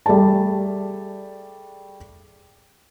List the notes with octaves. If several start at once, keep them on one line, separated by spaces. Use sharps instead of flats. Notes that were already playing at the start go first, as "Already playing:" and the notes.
G3 A3 G#4 D5 A5